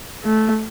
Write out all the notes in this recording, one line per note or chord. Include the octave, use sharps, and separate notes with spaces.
A3